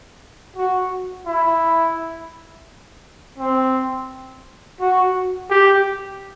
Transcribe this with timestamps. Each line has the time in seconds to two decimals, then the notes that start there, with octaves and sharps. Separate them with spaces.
0.56 F#4
1.26 E4
3.38 C4
4.80 F#4
5.50 G4